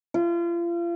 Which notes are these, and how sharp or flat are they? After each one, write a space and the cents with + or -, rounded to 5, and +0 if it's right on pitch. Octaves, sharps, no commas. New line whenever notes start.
F4 -35